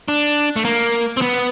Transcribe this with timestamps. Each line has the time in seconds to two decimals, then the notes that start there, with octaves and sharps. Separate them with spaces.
0.08 D4
0.56 A3
0.65 A#3
1.17 C4
1.22 B3